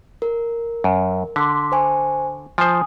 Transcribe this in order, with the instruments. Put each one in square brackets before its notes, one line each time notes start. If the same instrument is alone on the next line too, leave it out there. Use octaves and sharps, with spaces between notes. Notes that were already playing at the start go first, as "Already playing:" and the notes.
[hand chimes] A#4
[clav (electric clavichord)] F#2
[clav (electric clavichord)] D3 [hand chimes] C6 D6 B6
[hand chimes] C5 G#5 C#6
[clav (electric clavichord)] F3 C5 [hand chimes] G#5 D#6